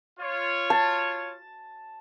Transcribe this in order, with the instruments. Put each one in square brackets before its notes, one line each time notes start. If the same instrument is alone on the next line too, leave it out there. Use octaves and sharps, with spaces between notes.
[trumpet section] F4 C#5
[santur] A5